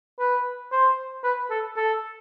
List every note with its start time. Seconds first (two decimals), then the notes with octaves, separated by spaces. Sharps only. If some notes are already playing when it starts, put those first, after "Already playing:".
0.19 B4
0.72 C5
1.24 B4
1.50 A4
1.76 A4